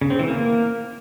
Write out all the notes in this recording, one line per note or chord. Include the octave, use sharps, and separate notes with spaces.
C#3
C4
E3
A#3